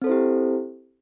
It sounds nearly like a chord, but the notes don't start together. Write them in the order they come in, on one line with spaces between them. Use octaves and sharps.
C4 A4 C5 E4 G4